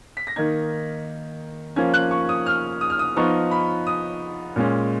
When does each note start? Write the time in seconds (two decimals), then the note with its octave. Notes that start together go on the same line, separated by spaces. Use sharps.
0.17 B6
0.27 A#6
0.36 D#3 A#3 D#4 G#6
1.76 F3 A#3 C#4 G#6
1.94 F#6
2.11 C#6
2.29 D#6
2.46 F6
2.81 D#6
2.90 F6
2.99 D#6
3.16 F3 B3 D#4 C#6
3.51 B5
3.87 D#6
4.56 A#2 G#3 C#4